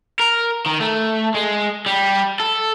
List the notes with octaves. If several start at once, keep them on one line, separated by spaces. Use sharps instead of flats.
A#4
D#3
A3
G#3
G3
A4